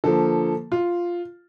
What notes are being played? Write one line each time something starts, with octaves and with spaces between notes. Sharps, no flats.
D3 F3 A#3 A4
F4